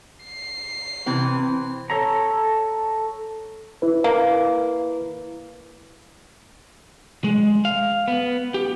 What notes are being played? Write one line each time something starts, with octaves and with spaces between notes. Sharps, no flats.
C7
C3 E3 C4
A4 C#5 A#5
E4 B4
A#3
G#3
F5
B3
G4